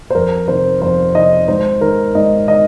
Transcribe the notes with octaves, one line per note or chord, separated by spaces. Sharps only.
C5
F2 A#4
C3 D#3 C5
F2 C5
C3 D#3 D#5
G#2 C5
D#3 A#4
G#2 D#5
D#3 D#5